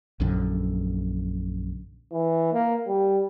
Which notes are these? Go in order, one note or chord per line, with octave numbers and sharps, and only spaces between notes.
A#1 F#2 D3
E3
A#3
G3